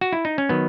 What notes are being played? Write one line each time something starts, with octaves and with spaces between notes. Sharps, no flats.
F#4
E4
D#4
C#4
D#3 F#3 B3